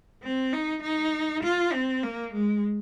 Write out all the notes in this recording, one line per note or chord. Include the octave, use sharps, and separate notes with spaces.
C4
D#4
D#4
F4
C4
A#3
G#3